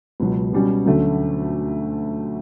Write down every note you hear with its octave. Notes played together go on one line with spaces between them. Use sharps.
C#2 B2 F#3
B2 G3 C#4
D2 D3 F#3 A3 C#4